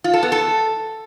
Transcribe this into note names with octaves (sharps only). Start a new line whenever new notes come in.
F4
A4
B3
A4